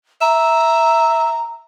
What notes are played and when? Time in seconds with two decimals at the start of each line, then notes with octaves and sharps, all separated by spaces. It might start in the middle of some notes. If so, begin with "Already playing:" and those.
0.21 E5 A#5